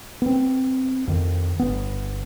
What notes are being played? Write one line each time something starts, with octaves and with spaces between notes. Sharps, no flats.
B3 C4
F2 D#3
G1 B3